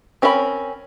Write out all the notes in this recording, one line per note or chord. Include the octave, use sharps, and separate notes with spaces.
C4 C#4 A#4 E5 B5